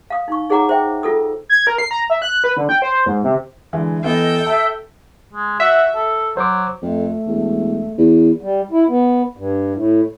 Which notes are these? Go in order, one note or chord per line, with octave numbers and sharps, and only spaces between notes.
F5 D#6
D#4 C#6
D#4 G#4 C#5 F#5 A#5 D6
C5 E5 G5
F4 A4 D#6 E6
G#6
A#4
C7
A#5
E5
F#6
B4
D3
G5
C5
G#2
C3
D3 E3 G#3
E3 B3 A4 D#5 G5
E5 A5 E6
G#3
F#4 E5
A4
F#3 C5 D6
F2 A3
E1
E2 E4
G3
E4
B3
G2
A2